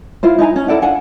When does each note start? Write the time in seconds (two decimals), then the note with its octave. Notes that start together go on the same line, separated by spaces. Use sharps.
0.23 E4 F4 C5
0.39 D#4 E4 G#5 A#5
0.56 C#4
0.68 E4 A4 D5 F#5
0.82 D4 F5 F#5 G#5